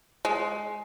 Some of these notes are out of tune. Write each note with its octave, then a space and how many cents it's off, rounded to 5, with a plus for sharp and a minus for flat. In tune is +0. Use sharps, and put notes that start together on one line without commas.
G#3 +15